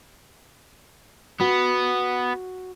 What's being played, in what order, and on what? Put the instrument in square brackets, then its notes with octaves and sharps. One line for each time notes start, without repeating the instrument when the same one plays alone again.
[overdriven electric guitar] B3 [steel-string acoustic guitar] F#4